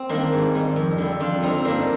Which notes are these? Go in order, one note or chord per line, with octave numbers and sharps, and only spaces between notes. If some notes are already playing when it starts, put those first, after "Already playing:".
Already playing: C4
D#3 G3 A#3 D4
G#2
D#3 G3
F2
D3 G3
F2 D4 F4
D3 G3 C4 D#4
G2 A#3 D4